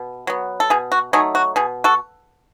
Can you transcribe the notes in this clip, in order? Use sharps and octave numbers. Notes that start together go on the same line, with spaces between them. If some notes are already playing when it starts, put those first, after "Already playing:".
Already playing: B2
F#3 B3
A4
B2 G#4
F#4
F#3 A3 D#4 G#4
F#4
B2 G#4
F#4 A4